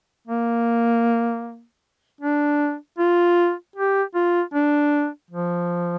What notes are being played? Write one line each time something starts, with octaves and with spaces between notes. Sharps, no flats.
A#3
D4
F4
G4
F4
D4
F3